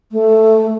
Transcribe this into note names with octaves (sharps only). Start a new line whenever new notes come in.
A3